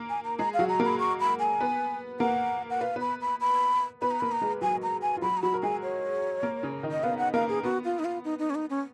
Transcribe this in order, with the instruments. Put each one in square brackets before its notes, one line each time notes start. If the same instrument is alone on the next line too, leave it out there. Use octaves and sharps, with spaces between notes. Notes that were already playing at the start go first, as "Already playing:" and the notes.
Already playing: [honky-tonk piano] A#3 A#4
[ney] G#5
A#5
[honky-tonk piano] G#3 G#4 [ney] A#5
[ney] F5
[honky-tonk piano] F#3 F#4
[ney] A#5
[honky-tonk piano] A#3 A#4
[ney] B5
C#6
B5
G#5
[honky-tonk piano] B3 B4
[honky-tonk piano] A#3 A#4 [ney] F#5
[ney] F#5
[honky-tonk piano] B4 [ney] F5
[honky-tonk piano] B3 B4 [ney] B5
[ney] B5
B5
[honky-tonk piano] B3 B4 [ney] B5
[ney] A#5
[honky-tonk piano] A#3 A#4 [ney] B5
[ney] A#5
[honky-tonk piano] G#3 G#4
[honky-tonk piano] F#3 F#4 [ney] G#5
[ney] A#5
G#5
[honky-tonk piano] F4
[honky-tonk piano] F#3 F#4 [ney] B5
[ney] A#5
[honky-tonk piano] F#3 F#4 [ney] B5
[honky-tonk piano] A#4
[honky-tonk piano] G#3 G#4 [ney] G#5
[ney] C#5
[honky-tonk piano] A#3 A#4
C#3 C#4
D#3 D#4
[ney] D#5
[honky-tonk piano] B3 B4 [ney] F5
[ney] F#5
[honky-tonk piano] A#3 A#4 [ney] F5
[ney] G#4
[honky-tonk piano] B3 [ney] F#4
[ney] F4
D#4
F4
D#4
D#4
C#4
D#4
C#4